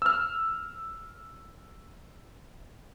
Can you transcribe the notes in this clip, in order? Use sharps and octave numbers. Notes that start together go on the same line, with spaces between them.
E6 F6